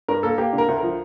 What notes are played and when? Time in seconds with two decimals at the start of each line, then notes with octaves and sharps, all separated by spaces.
0.08 G2 A#4
0.23 A#3 A4
0.38 A#3 G4
0.53 D3
0.58 A#4
0.68 D2
0.78 A#4
0.83 F3